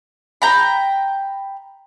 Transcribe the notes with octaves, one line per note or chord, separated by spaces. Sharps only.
G5 A#5 B5